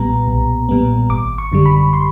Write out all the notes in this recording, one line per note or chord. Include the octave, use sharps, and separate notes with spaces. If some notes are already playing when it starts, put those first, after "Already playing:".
Already playing: B1 A#2 G3 B3 A#5
B1
A#2 G3 B3
G#1 D6
C#6
F#2 D3 G3
B5
C6